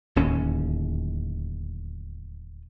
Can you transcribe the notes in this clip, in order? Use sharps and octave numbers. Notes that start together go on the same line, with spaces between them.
D1 D#2 C#4